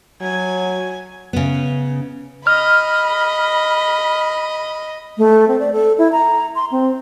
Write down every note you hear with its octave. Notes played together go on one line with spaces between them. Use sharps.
F#3 G#5
C#3 B3
D#5 B5 F6
A3
C4
D5
A4
E4
A#5
C6
C4